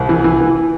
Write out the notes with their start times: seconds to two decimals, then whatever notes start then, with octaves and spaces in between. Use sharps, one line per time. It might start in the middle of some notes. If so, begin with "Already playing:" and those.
Already playing: C2
0.09 E3
0.24 E3
0.41 E3